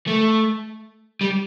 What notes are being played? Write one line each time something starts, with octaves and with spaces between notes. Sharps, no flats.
A3
G3